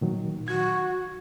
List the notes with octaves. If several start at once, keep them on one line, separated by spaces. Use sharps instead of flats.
A#2 D#3 F#3
F#4 G#6